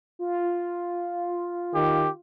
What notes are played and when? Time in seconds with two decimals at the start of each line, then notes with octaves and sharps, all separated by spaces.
0.19 F4
1.75 D#3 G4